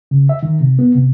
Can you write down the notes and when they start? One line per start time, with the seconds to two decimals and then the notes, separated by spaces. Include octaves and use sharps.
0.11 C#3
0.29 E5
0.43 D#3
0.61 C3
0.79 B3
0.95 C3